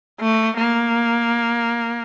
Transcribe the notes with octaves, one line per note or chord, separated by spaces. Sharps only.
A3
A#3